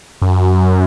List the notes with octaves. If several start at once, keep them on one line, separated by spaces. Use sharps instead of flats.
F#2